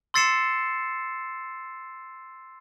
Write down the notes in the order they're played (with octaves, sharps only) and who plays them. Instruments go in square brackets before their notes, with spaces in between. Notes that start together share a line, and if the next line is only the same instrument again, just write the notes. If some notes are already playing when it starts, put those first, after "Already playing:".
[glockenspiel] C6 E6 A6 C7 C#7 E7